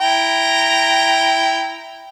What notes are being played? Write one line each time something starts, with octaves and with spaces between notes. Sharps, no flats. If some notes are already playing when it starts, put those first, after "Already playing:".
E4 G5 A#5